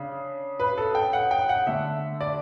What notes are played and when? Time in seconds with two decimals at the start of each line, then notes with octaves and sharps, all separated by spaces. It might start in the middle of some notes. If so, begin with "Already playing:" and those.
Already playing: C#3 D4
0.60 B4
0.78 A4
0.95 G5
1.13 F#5
1.31 G5
1.49 F#5
1.67 D3 A3 D4 E5
2.21 D5